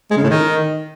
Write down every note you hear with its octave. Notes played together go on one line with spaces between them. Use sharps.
G#3
C#3
A2
D#3